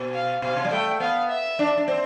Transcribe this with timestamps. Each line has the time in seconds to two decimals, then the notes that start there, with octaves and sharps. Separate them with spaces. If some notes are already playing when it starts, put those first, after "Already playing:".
Already playing: B2
0.14 F5
0.42 B2 F5
0.57 C3
0.65 G3
0.71 A3 G5
1.00 B3 F5
1.29 E5
1.59 D4
1.78 D4
1.88 C4